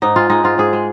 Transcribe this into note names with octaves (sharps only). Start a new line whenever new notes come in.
G#2 D#4
G#3 F4
G#3 D#4
G#2 F4
G#2 G#4
G#3